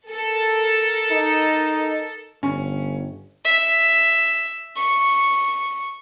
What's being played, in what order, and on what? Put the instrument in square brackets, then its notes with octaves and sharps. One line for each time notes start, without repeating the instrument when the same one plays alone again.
[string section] A4 A#4
[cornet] D#4
[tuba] G1 [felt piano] C#4
[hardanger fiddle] E5
C#6